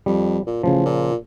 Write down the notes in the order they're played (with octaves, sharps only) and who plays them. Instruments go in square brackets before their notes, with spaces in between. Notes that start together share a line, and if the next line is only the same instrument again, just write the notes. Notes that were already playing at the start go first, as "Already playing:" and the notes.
[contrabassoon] F2 [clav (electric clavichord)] G3
[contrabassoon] A#2
[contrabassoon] A1 [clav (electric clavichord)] C#3 F3
[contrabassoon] A#2